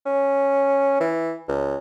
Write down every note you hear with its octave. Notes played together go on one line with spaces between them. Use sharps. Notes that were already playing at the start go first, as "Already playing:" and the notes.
C#4
E3
C#2